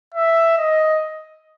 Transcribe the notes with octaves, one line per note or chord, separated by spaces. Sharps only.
E5
D#5